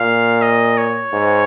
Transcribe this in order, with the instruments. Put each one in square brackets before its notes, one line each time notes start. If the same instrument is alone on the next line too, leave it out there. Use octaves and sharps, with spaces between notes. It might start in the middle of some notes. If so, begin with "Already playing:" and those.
Already playing: [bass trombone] A#2 [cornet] F5
[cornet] D#5
C#5
[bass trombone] G#2